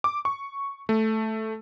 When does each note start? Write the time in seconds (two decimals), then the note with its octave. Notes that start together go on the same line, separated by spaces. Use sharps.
0.04 D6
0.25 C#6
0.89 A3